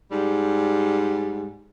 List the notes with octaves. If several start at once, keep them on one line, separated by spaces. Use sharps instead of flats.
G#2 G3